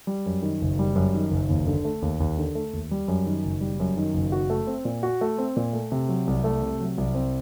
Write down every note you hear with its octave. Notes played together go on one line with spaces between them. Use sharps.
G3
F#2
D#3
F#1
G3
F#2
D#3
F#1
D#2
D3
A3
D#2
D#2
D3
A3
D#2
G3
F#2
D#3
F#1
G3
F#2
D#3
F#1
F#4
A3
C4
A#2
F#4
A3
C4
A#2
A3
C3
F#3
C2
A3
C3
F#3
C2
C4